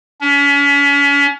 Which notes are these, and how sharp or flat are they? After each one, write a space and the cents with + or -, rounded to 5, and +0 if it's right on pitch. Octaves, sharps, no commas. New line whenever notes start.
C#4 +40